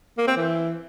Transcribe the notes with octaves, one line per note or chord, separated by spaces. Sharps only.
A#3
C4
E3